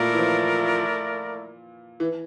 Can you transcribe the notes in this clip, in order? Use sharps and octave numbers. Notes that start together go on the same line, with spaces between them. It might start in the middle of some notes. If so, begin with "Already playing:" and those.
Already playing: A#2 A3 E4 A#4 D5
E3
F3
E3